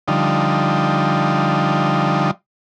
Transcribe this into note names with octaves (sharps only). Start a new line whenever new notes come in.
D3 F3 G3 D#4